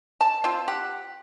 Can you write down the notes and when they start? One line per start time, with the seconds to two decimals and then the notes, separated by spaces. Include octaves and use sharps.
0.21 A5
0.44 C4 F4
0.68 G4 F#5